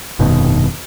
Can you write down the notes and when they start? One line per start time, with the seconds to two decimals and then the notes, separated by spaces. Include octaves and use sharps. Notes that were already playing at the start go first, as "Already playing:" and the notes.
0.19 F1 G2 B2 D#3